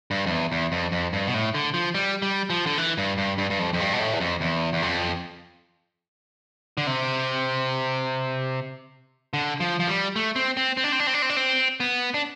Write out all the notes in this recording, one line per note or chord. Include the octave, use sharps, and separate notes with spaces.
G2
F2
E2
E2
F2
F2
G2
B2
A2
D3
F3
G3
G3
F3
D3
E3
G2
G2
G2
G2
F2
F2
G2
B2
A2
E2
F2
E2
E2
F2
D3
C3
D3
F3
F3
G3
A3
C4
C4
C4
D4
C4
D4
C4
D4
C4
D4
C4
B3
D4